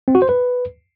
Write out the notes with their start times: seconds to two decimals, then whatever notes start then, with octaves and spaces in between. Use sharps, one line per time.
0.08 C4
0.15 F#4
0.22 C5
0.29 B4